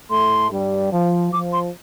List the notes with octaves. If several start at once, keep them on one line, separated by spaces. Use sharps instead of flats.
A2 A3 C6
G2 G3
F3
F3 D6
C6